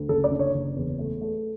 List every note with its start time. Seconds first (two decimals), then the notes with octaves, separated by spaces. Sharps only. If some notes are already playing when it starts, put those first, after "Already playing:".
Already playing: D2
0.08 F#1 A4
0.24 D5
0.31 D3
0.39 C#5
0.54 F#1
0.76 E2
0.99 A3
1.21 A3